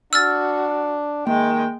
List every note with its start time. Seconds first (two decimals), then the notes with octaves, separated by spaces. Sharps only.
0.13 D4 F#4 E6 F6 A6
1.27 D#3 G#3 A#3 G5